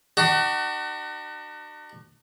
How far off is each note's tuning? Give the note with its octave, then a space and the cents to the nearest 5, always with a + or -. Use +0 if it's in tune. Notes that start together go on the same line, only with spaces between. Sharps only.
D4 +45 F#4 +35